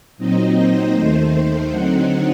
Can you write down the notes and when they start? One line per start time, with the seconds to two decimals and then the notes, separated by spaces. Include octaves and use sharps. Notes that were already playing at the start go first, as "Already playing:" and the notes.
0.17 A#2 F#3 C4 D#4 D#5
0.56 C5
0.93 D#2 D#3 A3 C5
1.69 D3 F#3 C4 D#4 F#5